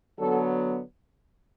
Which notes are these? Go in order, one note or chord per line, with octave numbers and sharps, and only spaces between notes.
D3 F#3 B3 A4